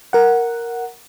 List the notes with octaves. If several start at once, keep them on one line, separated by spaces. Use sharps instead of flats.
A#4 F#5